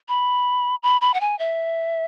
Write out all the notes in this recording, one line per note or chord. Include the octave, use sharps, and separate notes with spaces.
B5
B5
B5
F#5
G#5
E5